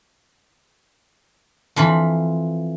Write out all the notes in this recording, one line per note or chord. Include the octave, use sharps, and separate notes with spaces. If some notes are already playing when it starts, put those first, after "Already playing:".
F2 E3 F4 B5